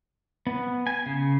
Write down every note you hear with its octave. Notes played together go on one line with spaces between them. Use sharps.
B3
G#5
C#3